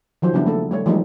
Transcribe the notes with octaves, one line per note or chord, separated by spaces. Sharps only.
D#3 F3 F#3 C5
C#3 G3 B3 D4 E4 G4
A3 A#3 A4
G3 A3 C#5
E3 F3 G3 G#3 A#3 D#4